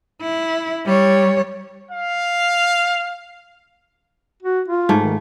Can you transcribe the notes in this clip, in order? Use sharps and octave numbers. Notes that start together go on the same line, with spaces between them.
E4
G3 C#5
F5
F#4
F4
G#2 A3
D#3